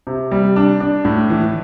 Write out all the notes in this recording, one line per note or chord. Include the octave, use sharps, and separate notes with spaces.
C3
G3
D4
D4
A2
E3